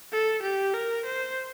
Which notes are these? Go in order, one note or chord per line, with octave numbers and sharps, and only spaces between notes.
A4
G4
A#4
C5